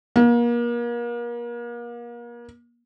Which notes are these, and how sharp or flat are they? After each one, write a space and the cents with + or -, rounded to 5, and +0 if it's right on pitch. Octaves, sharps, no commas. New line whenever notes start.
A#3 +35